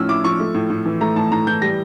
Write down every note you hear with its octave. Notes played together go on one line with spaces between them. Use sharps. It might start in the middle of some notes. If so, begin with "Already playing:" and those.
Already playing: A2 F3 C#4 E6 F6
E4 D6
F3 C#6
A3
A2
A2
E3
A3 A#5
A2 A5
A2 A#5
E3 G6
G3 A#6